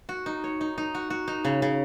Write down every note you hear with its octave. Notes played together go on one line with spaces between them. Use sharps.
F#4
D#4
C#5
D#4
D#4
F#4
F#4
D#4
C#3
C#3